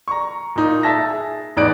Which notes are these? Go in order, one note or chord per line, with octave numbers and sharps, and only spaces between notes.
A#5 C#6
A#2 D#4
E5 A5 E6 A6 A#6
G#4
A1 E2 D#4 D5 F#6 D7